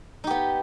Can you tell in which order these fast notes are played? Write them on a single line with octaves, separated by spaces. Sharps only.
D#4 G4 B3